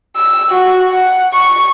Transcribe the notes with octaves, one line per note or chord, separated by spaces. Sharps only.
E6
F#4
F#5
C#6